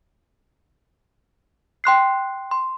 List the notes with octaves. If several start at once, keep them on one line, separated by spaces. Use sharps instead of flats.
G5 C6 F#6 C7
C6